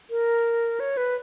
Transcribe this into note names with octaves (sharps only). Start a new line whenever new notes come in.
A#4
C#5
B4